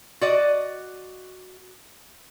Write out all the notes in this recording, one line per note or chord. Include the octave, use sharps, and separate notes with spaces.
F#4 D5 D#5